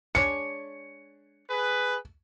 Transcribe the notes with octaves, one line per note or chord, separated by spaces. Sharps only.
G#3 D4 C#5 C#7
G#4 B4